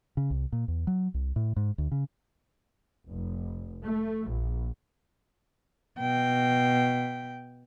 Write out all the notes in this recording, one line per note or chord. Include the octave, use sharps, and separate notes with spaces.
C#3
C2
A#2
E2
F#3
C2
A2
G#2
D2
C#3
F1
A3
A#1
B2 G5